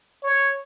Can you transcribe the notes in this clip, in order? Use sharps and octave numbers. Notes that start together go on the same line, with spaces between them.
C#5